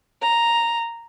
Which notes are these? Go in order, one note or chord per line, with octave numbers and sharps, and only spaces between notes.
A#5